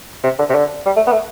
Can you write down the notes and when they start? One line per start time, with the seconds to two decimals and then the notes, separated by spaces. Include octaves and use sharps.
0.24 C3
0.39 D3
0.49 C3
0.55 D3
0.86 G3
0.96 A3
1.07 B3
1.12 A3